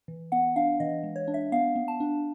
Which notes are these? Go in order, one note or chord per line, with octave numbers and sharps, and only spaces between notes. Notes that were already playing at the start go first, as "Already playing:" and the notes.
E3
B3 F#5
D4 F5
E3 D#5
G#3
C#5
D4
E5
B3 F5
B3
A5
D4